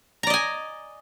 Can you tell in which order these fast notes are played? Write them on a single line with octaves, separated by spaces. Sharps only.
A#5 D5 D#5 G#5